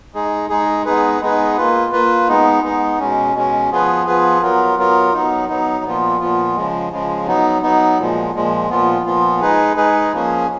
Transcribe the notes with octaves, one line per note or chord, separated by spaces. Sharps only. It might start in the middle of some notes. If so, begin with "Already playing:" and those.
G#3 D#4 G#4
G#3 D#4 G#4
G#3 B3 D#4 G#4 B4
G#3 B3 D#4 G#4 B4
A#3 F4 B4
A#3 F4 B4
G#3 B3 D#4
G#3 B3 D#4
B2 G#3 C#4
B2 G#3 C#4
F3 B3 F4 G#4 B4
F3 B3 F4 G#4 B4
F#3 B3 F4 A#4
F#3 B3 F4 A#4
F#3 B3 D#4
F#3 B3 D#4
A#2 F3 B3 F4
A#2 F3 B3 F4
C#3 F3 G#3
C#3 F3 G#3
F#3 B3 D#4
F#3 B3 D#4
A#2 F3 G#3
A#2 F3 G#3
A#2 F3 B3 F4
A#2 F3 B3 F4
G#3 D#4 G#4 B4
G#3 D#4 G#4 B4
F3 A#3 C#4 G#4